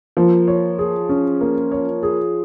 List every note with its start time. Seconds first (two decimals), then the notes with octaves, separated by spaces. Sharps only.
0.17 F3 A#3
0.48 C#5
0.79 G#4
1.09 C#4
1.41 A#3
1.72 C#5
2.03 G#4